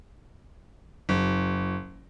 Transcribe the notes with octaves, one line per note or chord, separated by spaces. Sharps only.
F#1